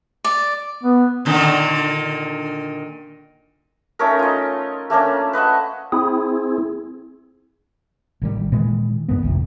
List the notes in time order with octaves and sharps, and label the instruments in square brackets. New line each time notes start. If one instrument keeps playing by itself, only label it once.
[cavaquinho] D5
[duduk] B3
[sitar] A#2 D3 D#3
[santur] A3 C#4 D#4 A#4
F4 D#5
A3 A#3 C#4 D4
B4 D#5 E5 F#5
[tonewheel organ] C4 E4 G#4
[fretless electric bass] A1 D#3 G3
A#2 D#3 E3 G#3
G2 D#3 B3
G1 C2 F2